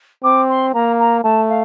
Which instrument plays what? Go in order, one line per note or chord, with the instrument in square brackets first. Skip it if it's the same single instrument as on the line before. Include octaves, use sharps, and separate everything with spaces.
[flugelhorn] C4 [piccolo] D6
[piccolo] C6
[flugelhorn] A#3 [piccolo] A#5
[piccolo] A#5
[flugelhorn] A3 [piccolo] A5
[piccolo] F5